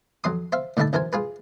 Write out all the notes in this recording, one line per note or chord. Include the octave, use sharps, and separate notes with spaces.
F2 F#3 C6 D#6
C5 E5 F5
A2 D3 D#3 E4 E5 A5
F#2 E3 A#4 C5 G#5
F4 G#4 B4